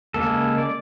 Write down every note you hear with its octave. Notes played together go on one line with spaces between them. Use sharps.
C#3 G#3 A#3 A4
D5